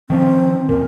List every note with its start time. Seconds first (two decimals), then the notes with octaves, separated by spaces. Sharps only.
0.10 D#3 F3 C4 C#4
0.69 D#2 A#2 A#4